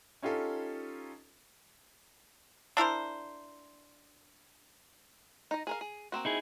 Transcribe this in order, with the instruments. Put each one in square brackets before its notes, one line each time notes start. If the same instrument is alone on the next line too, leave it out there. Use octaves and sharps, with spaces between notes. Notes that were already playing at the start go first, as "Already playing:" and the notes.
[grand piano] C#4 D#4 F4 G4 A4
[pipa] D4 E4 A#4 C5
[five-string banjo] D#4 D#5
G#4 A#4 F5
G#4
A#3 C4 F#4
[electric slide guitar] D#4 E4 G#4